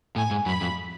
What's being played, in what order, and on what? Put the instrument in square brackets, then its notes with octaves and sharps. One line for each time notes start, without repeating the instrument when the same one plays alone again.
[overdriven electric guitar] A2 [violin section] G#5
[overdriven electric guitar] G#2
[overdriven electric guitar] F#2 [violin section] B5
[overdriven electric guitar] F2